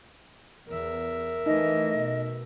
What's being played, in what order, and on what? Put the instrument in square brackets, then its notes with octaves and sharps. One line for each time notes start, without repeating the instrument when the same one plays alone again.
[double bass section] E2 [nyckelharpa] A#4 E5
[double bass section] E3 A3 [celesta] D#4 [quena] D#5
[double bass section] B2